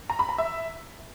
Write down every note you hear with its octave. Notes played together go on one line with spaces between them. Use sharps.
A#5
B5
A#5
E5